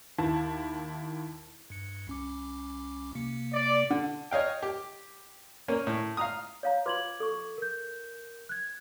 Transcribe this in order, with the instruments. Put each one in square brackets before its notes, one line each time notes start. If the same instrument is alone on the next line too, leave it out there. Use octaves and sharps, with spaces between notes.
[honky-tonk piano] D#2 E4 A5
[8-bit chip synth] G2 C#7
C2 C#4 D6
C3 A#3 C#7
[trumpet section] D5
[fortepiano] D3
C#5 D#5 F5 G5
G4
A#3 C#4
A2
F5 A#5 D#6
[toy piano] C#5 F5 A#5
[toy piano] F4 B4 C6 [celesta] D6 G#6 F#7
[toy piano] A4 C#6
[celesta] A#4 G6
F#6 G#6